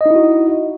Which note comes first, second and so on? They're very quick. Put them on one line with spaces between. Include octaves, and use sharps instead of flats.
D#5 D#4 E4 F#4